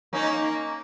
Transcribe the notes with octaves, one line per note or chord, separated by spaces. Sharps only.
A#3 C#4 D#4